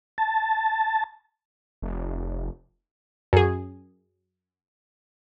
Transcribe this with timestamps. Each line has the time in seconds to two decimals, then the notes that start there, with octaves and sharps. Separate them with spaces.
0.18 A5
1.82 F1
3.33 F#2 G#4